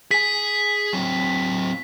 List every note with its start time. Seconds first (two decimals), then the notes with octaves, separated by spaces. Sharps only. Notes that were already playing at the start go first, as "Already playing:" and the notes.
0.11 G#4 G#5 B6
0.93 F#3 C4